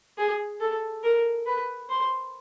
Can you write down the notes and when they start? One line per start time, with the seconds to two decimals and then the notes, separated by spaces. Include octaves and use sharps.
0.18 G#4
0.61 A4
1.04 A#4
1.46 B4
1.89 C5